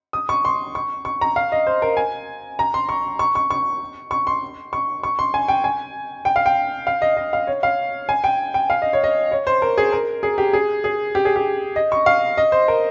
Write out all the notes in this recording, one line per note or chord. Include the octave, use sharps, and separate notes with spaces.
D#6
C#6
C6
C#6
C#6
A#5
F5
D#5
C5
A#4
G#5
A#5
C6
C#6
C#6
C#6
C#6
C#6
C6
C#6
C#6
C6
G#5
G5
G#5
G5
F5
G5
F5
D#5
D#5
F5
C#5
F5
G#5
G5
G5
F5
D#5
C#5
D#5
C#5
C5
A#4
G#4
A#4
G#4
G4
G#4
G#4
G4
G#4
G4
D#5
C#6
F5
D#5
C5
A#4